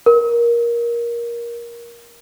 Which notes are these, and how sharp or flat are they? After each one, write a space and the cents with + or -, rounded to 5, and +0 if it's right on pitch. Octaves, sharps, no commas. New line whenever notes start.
A#4 +15